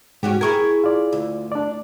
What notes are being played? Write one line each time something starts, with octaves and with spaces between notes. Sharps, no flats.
G#2 C#4 F#4 G4
E4 G#4 A#4 C#6 G#6
F4 D5
D2
D4 D5